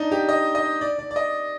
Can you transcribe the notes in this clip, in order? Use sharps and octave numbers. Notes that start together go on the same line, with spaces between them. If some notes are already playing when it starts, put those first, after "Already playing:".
Already playing: D4 D#4
G4
D#5
D#5
D5
D5
D5
D#5